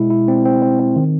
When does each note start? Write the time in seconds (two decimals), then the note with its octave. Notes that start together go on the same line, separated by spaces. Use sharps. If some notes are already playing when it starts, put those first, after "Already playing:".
Already playing: B2 G#3 E4
0.10 E4
0.28 C4
0.45 C4
0.62 C4
0.80 C4
0.96 D#3